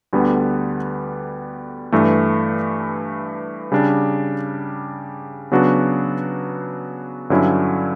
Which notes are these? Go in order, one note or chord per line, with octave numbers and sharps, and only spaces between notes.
D2 D3 G3 B3
G2 E3 A3
C#3 G3 D4
C#3 F#3 B3 D4 F#4
G2 D3 F#3 C#4 E4